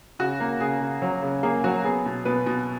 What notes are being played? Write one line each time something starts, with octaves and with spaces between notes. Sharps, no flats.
C#3 F#4
A#3
C#3 G#4
C#3
F#3
C#3
A#3 G#4
F#3 F#4
B3 G#4
B2
B2 B4
B2